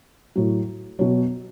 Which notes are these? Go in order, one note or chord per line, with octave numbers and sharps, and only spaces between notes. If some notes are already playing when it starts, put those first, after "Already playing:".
A2 F#3
B2 F#3 C#5